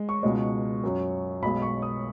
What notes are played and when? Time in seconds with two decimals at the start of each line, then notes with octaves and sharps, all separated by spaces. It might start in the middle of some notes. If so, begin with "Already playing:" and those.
Already playing: G#3
0.09 C#6
0.23 C#2 B2 G#3
0.83 F#2 F#3
1.42 B1 B2 G#3 B5
1.62 C#6
1.82 D#6